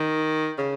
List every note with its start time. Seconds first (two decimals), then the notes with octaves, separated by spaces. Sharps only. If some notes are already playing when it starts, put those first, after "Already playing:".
Already playing: D#3
0.58 C#3